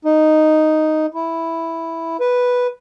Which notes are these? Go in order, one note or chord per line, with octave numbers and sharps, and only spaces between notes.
D#4
E4
B4